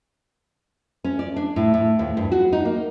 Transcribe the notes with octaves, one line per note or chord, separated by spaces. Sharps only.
C#4
D5
D4
A2
A2
D#2
G2
F#4
D#4
A#3